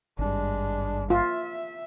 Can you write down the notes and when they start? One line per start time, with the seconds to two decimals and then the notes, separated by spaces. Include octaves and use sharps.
0.19 G#1 G2 G#3 D4
1.10 F4 E5